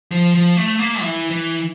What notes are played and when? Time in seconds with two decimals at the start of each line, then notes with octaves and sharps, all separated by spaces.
0.12 F3
0.35 F3
0.57 A3
0.79 A#3
1.01 E3
1.31 E3